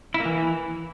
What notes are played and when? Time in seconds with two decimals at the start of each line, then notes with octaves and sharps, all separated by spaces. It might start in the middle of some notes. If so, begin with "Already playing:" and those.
0.14 E4
0.20 A#3
0.25 E3